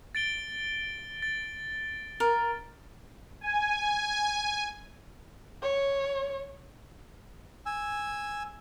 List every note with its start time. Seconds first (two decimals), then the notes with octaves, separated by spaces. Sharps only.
0.15 A6 D7 G7
1.22 A6
2.20 A#4
3.41 G#5
5.62 C#5
7.66 G#5 E6